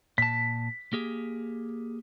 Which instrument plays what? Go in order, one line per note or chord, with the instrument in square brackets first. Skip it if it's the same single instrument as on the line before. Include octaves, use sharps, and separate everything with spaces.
[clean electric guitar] A#2 A5 [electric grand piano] B6
[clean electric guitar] A#3 G4 G#4